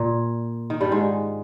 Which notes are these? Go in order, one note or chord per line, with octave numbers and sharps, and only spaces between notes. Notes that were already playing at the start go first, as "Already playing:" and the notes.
Already playing: A#2
D#3
G2 G3
G#2 G#3